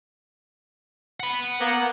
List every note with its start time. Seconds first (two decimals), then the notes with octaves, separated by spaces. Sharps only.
1.20 F#5 B5
1.60 A#3 B3